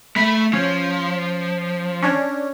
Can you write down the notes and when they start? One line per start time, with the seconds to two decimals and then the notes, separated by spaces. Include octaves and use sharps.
0.16 A3 E5 B5
0.53 F3 C#4
2.02 C#4 D4